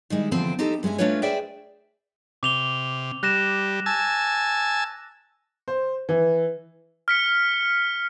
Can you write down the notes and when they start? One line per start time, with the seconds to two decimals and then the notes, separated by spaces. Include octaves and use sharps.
0.10 D#3 G3 G#3 E4
0.31 E2 D3 F3 C4 C5
0.59 C4 D#4 E4 G4 A4
0.83 G2 G#3 C#4 E5 G#5
0.98 A3 C#4 D4 F4 B4 C#5
1.22 G#4 B4 C5 D5 E5 G5
2.43 C3 D6 F7 G7
3.23 G3 F#6 A#6 E7
3.86 G#5 A5 E6
5.68 C5
6.09 E3
7.08 F6 B6 C#7